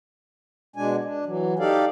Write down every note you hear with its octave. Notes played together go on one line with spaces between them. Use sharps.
B2 G#3 D4 G#5
D4
E3 F#3
D#4 G4 A4 D5 F5